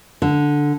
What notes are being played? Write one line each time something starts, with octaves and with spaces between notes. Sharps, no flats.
D3